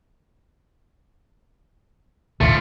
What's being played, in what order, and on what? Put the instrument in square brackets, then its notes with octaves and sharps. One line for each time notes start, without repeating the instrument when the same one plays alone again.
[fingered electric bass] E1 A1 D2 [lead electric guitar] A3 F4